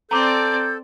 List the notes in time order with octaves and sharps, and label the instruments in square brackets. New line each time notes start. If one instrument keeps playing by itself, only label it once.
[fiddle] C4 D5 [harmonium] A4 [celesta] A#5 D6 [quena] G6